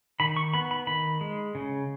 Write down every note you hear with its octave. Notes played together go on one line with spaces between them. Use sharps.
D#3 B5
C#6
B3 B5
B5
D#3 B5
G#3
C#3